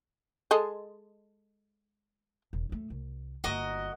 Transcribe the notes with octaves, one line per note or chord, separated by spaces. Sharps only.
G#3 A4 D#5
E1
F#2 A3
C2
G1 A#3 F#4 A#4 D#5